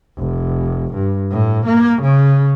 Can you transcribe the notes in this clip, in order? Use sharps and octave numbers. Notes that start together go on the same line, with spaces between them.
F1
G2
A2
A#3
C#3